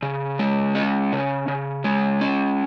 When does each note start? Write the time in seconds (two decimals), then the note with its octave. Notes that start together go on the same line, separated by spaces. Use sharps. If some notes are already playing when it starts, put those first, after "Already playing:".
0.03 C#3
0.39 G#3
0.75 C#4
1.12 C#3
1.48 C#3
1.84 G#3
2.21 C#4